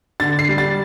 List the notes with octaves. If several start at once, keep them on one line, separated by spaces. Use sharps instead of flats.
D3 A6
C7
G3
A6